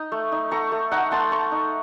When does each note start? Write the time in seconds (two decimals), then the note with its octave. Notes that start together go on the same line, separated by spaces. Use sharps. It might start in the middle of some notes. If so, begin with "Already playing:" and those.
Already playing: D#4 D#6
0.12 A3
0.32 D#4
0.51 A3 A#5 C#6
0.72 A3
0.91 D#4 F#5 A#5
1.11 A3 A5 C6
1.32 A3 A#5 C#6
1.52 D#4